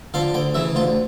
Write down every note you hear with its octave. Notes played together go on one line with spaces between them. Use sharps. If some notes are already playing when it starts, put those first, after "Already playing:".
D3 F3 F5
D2 G5
C#3 E3 E5
D2 F4